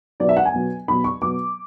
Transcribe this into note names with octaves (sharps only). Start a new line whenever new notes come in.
B2 F#3 B3 D5
E5
F#5
G#5
B2 F#3 B3
B2 F#3 B3 B5
C#6
B2 F#3 B3 D6